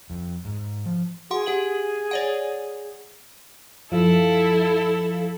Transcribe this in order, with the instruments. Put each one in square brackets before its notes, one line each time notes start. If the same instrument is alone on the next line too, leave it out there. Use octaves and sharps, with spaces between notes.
[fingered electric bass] F2
G#2
F3
[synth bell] F#4 F#5 C6 [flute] G#4
[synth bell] G4 F#5 F#7
C#5 D5 F#5
[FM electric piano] F#2 F3 F5 [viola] E4 A4